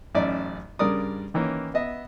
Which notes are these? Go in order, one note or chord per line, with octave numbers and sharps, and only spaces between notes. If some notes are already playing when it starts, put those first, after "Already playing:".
A1 F#2 C#4 D#4 D5 E5
G2 C#3 A#4 D5 D#6
D#3 E3 A#3 C#4
B3 D#5 E5